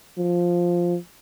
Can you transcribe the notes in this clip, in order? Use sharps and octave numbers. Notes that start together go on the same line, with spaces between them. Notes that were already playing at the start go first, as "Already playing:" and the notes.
F3